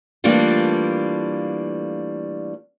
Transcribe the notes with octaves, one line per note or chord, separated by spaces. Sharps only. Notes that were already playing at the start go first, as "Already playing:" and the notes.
E3 G3 A3 A#3 D4 F4